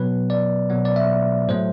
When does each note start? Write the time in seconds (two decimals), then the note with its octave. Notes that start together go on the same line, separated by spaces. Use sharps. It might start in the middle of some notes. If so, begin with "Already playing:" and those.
Already playing: B2 F#3 B3 B4
0.30 D5
0.70 B2 F#3 B3
0.85 D5
0.96 E5
1.48 A2 F#3 A3 C5